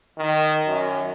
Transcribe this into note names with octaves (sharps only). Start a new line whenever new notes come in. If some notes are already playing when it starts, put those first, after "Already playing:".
D#3
F#2